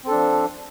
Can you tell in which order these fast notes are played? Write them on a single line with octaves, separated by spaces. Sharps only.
C4 A4 D4 F3